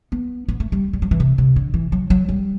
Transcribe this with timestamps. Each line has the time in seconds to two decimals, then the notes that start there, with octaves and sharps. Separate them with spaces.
0.12 B3
0.49 B3
0.60 A3
0.72 G3
0.93 G3
1.02 F#3
1.11 E3
1.20 C3
1.38 C3
1.56 D3
1.74 E3
1.92 F#3
2.10 F#3
2.29 G3